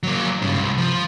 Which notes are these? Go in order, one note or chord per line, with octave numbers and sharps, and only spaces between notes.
F#3 A#3
G2 C#3
C2
F3